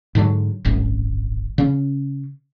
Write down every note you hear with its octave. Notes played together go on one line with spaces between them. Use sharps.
G#2 D3 E3 F#3
D1 G#1 F#2
C#3 C#4